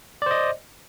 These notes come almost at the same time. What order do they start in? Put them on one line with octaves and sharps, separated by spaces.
D5 C5 D#5